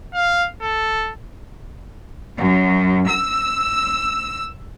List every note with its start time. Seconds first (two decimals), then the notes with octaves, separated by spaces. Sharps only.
0.14 F5
0.61 A4
2.38 F#2
3.09 E6